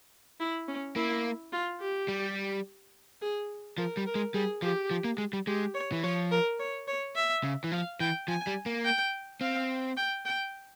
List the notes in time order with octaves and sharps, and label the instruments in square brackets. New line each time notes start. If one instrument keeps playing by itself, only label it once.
[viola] E4
C#4
[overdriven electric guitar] A#3 [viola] E4
[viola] F4
G4
[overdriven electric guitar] G3
[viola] G#4
[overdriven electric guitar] F3 [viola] A#4
[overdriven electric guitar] G3
[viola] A#4
[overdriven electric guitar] G#3
[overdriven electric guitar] G3 [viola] G#4
[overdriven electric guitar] F3 [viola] G4
[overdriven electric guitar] F3
A#3
G#3
G3
[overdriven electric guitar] G#3 [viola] G4
[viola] C#5
[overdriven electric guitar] E3
[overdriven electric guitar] F3 [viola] C#5
[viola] A#4
C#5
C#5
E5
[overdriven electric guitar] C#3
E3
[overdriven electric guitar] F3 [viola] F5
[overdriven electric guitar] E3 [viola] G5
[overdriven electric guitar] F3 [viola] G#5
[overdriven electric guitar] G3
A#3
[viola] G5
[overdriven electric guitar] C4 [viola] F5
[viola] G5
G5